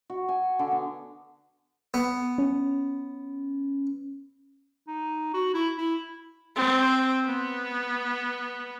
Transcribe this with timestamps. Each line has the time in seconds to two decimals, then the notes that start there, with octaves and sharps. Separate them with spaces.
0.10 F#4
0.29 G#5
0.59 D3
0.71 B3
1.94 B3
2.38 C#4
4.87 D#4
5.34 F#4
5.54 E4
5.77 E4
6.56 C4
7.26 B3